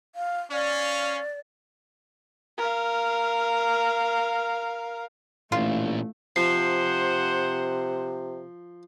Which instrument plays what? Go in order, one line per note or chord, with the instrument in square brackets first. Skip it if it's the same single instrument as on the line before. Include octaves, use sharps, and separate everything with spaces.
[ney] F5
[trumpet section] C#4 F5 [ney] D5
[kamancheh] A#4 F5
[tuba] A1 [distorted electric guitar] A#2 D4 [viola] A3 [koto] F4
[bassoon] C3 [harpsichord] F3 [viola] C5 F#5 [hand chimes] C7